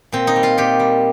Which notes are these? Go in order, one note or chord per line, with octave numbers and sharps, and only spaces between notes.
A#2 C4
D#4
G3
F4
A#2 G4
G3